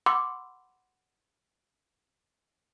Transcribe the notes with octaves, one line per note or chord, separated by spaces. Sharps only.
F#5 B5 C6 D6 E6